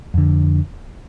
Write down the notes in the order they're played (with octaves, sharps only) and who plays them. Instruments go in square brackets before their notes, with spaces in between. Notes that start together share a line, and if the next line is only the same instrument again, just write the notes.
[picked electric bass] F2 D3